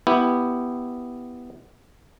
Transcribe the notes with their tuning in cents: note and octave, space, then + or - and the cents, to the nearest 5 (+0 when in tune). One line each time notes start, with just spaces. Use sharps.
B3 +0 E4 +0 G4 +0